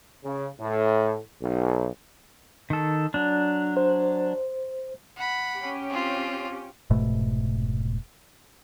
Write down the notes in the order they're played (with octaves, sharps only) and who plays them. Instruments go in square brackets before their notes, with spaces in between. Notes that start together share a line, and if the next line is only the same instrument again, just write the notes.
[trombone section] C#3
A2
B1
[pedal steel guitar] D#3 A4
F#3 D4
[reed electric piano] C5
[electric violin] F#5 B5
[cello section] C#4 G4
[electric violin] C4 F4
[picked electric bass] F1 G#2 B2 A3